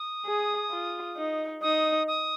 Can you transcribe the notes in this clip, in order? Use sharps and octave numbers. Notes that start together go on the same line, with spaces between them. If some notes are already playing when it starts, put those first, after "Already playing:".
Already playing: D#6
G#4
F4
D#4
D#4 D#6
D#6